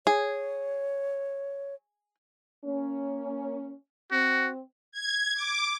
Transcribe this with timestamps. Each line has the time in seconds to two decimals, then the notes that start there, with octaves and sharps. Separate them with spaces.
0.07 G#4 C#5
2.65 A#3 C#4
4.12 C4 F#4
4.92 G#6
5.34 D6